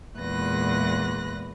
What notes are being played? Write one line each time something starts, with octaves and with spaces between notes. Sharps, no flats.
E2 A#2 G#3 B4 F#6 A#6